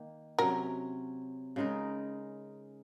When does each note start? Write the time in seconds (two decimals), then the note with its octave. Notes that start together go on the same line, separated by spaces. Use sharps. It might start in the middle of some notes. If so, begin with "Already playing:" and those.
Already playing: D#3 A#3
0.38 C3 F#3 C#4 A#4
1.56 C#3 G#3 D#4 A#4